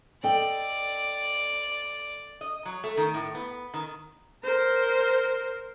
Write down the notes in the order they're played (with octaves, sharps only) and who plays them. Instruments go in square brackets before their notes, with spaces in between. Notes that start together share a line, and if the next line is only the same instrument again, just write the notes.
[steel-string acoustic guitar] A4 D#5 G5 [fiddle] D5
[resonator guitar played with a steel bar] D#5
F#3
A3
D#3
A2
B3
D#3
[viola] A#4 C5